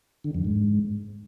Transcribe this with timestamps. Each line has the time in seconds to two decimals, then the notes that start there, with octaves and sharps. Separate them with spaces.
0.24 D3
0.35 F2
0.45 G#2